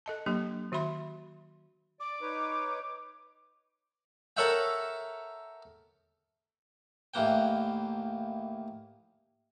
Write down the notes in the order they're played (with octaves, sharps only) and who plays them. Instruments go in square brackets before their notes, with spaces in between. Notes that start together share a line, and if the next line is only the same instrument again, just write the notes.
[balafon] A4 D#5 A5
F#3 A#3 D4 G4 D#5
D#3 F#4 E5 B5 C6
[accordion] D5 [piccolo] D6
[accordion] D#4 B4 C#5
[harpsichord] A4 A#4 C#5 E5 F#5 G5
D#2 A2 E3 A#3 F#5 G5